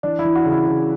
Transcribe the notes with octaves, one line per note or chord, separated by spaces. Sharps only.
E3 D4
E4
E3
F#4
C#3
E4
C#3